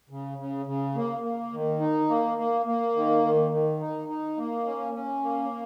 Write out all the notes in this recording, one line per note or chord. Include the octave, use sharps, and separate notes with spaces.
C#3
C#3
C#3
A#3
A#3
D#3
D#4
A#3
A#3
A#3
D#3
D#3
D#3
D#4
D#4
A#3
C#4
C#4
A#3